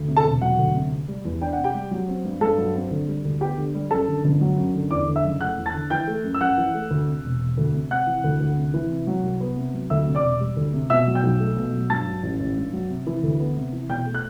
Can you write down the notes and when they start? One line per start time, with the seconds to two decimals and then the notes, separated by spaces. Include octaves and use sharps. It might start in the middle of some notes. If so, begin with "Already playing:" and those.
Already playing: D2
0.08 C3
0.16 A4 A5
0.25 E1
0.41 F#3 F#4 F#5
0.59 D2
0.74 C3
0.91 C3
1.08 G3
1.25 E2
1.42 D4 G5
1.53 F#5
1.58 C3
1.64 G4 G5
1.75 G3
1.91 F#3
2.08 C4
2.24 G2
2.41 G2 A4 A5
2.58 F#3
2.75 C4
2.91 D3
3.08 G3
3.25 D2
3.41 B3 G4 G5
3.58 D3
3.75 G3
3.91 F#2 A4 A5
4.08 D3
4.24 G1
4.41 F#3
4.58 F#2
4.75 D3
4.91 E2 D5 D6
5.08 D3
5.16 E5 E6
5.24 F#1
5.41 A3 F#5 F#6
5.58 E2
5.66 A5 A6
5.74 D3
5.90 E3 G5 G6
6.07 A3
6.24 F#2
6.34 E6
6.41 F#2 F#5 F#6
6.58 E3
6.74 A3
6.91 D2
7.08 C3
7.24 E1
7.41 E1
7.57 D2
7.74 C3
7.90 C3 F#5 F#6
8.07 E3
8.24 D2
8.40 D2
8.57 C3
8.74 E3
8.91 C3
9.07 F#3
9.23 C2
9.40 B3
9.57 C3
9.74 F#3
9.90 D2 E5 E6
10.07 C3
10.15 D5 D6
10.24 E1
10.40 G3
10.57 D2
10.73 C3
10.90 B2 E5 E6
11.07 F#3
11.15 G5 G6
11.23 B1
11.40 A3
11.57 B2
11.73 F#3
11.90 G2 A5 A6
12.07 F#3
12.23 A1
12.40 A1
12.57 G2
12.73 F#3
12.90 C3
13.07 E3
13.23 D2
13.40 B3
13.56 C3
13.73 E3
13.90 B2 G5 G6
14.06 A3
14.14 F#6